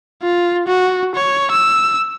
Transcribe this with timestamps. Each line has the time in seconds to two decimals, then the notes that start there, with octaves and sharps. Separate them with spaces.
0.23 F4
0.68 F#4
1.16 C#5
1.52 E6